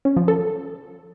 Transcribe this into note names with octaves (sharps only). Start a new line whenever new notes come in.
C#4
F3
A4